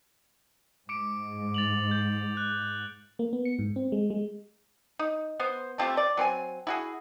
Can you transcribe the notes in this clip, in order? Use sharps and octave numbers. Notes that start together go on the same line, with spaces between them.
G#2 D6 C#7 D7
A6 F7 F#7
G6
F#6
A#3
B3
C#7
G#2
C4
G#3
G#3
D#4
B3 C5
A3 C4 F4 G4
D5
F#3 C4 C5 G#5
E4 F#4 G#4